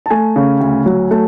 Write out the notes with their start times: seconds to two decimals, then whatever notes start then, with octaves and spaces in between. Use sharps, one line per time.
0.06 A5
0.10 A3 G#5
0.36 C#3
0.61 D2
0.86 F#3
1.11 A3